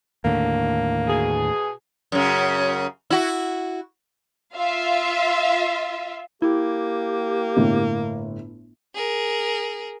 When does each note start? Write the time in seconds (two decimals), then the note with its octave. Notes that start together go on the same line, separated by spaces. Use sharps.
0.25 D#2 A2 D3 A#3
1.07 B2 G#4
2.12 F#2 C#3
3.10 E4 F#4
4.55 F4 E5 F5
6.42 A#3 E4 G4
7.57 G1 A2
8.94 G#4 A#4